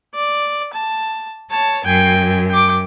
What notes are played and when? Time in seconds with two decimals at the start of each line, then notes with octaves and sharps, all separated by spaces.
0.15 D5
0.74 A5
1.51 C#5 A5
1.85 F#2 G5 G#5
2.49 G5 D6